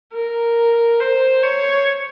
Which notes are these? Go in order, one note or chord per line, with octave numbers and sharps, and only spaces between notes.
A#4
C5
C#5